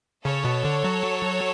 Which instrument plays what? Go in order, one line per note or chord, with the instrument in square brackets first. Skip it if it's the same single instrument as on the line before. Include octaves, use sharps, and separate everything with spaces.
[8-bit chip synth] C#3 [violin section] A4 C#5
[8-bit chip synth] B2
D3
F#3